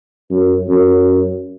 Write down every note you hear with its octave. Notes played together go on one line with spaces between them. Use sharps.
F#2
F#2